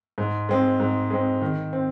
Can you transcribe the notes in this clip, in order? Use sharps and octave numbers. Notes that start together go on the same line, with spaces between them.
G#2
G#3 C4
G#2
G#3 C4
D#3
C4